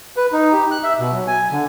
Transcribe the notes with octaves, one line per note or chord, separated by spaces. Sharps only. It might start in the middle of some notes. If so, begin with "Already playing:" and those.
B4
D#4
G4
F#6
E5
B2
F#3
G#5
D3